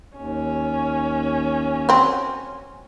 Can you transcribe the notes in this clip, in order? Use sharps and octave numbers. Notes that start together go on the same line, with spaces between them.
D#2 C#4
F#3 C4